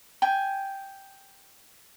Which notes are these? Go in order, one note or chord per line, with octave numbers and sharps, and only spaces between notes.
G5 G#5